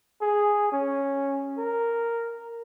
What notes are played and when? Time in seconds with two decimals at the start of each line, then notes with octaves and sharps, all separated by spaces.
0.21 G#4
0.72 C#4
1.58 A#4